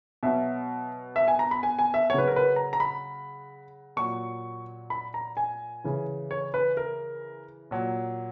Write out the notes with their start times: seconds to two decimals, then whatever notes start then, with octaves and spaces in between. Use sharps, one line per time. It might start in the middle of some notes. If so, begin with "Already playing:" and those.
0.23 B2 F#3 E5
1.16 E5
1.28 G#5
1.39 A#5
1.51 B5
1.63 G#5
1.79 G#5
1.94 E5
2.09 F#3 C#5
2.14 C#3 B4
2.27 A#4
2.36 B4
2.56 A#5
2.73 A#5
2.80 B5
3.96 A#2 F#3 C#6
4.90 B5
5.14 A#5
5.37 G#5
5.84 C#3 E3
6.31 C#5
6.54 B4
6.77 A#4
7.71 A#2 F#3